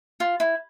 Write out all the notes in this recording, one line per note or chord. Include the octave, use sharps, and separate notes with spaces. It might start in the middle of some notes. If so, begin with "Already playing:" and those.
F4
E4